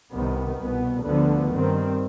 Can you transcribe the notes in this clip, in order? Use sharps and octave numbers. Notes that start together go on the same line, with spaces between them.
C2 C3 D#3 B3
C2 B2 B3
D2 D3 F3 B3
G2 D#3 G3 C4